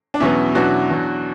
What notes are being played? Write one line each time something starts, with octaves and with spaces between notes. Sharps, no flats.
D4
E2 B2 F#3 B3 C#4 E4
E2 B2 F#3 B3 D4 F#4
E2 B2 F#3